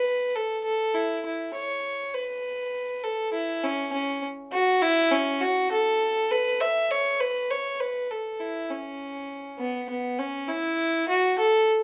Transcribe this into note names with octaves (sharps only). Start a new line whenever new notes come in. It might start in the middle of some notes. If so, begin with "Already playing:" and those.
Already playing: B4
A4
A4
E4
E4
C#5
B4
A4
E4
C#4
C#4
F#4
E4
C#4
F#4
A4
B4
E5
C#5
B4
C#5
B4
A4
E4
C#4
B3
B3
C#4
E4
F#4
A4